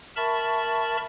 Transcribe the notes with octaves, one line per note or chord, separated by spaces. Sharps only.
A#4 E5 A5 B5 C#6 A6